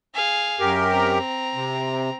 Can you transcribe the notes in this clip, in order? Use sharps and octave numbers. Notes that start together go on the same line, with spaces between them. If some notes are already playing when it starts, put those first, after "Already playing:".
G#4 F5
F#2 G4 A#4
C4 A#5
C3